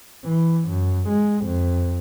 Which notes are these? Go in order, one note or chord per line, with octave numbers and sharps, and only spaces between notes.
E3
F#2
G#3
F2